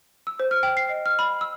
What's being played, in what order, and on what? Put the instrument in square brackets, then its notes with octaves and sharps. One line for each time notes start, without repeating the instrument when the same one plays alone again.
[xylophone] E6
C5
F6
G5
C7
D#5
F6
B5
E6